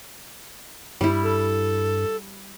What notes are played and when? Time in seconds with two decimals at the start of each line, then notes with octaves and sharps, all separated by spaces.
1.01 G2 G3 E4
1.23 A4